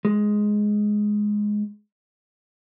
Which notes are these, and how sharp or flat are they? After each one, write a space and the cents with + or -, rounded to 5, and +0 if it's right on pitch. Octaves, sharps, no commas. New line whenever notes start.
G#3 +5